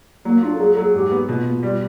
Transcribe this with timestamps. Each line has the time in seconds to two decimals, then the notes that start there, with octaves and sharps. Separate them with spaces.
0.25 F#3 A#3
0.43 D4 F4
0.54 A4
0.59 F#3 G#4
0.72 F#3 A4
0.83 G#4
0.94 G#2 G4
1.11 B3
1.28 B2 F4
1.45 B2
1.63 G3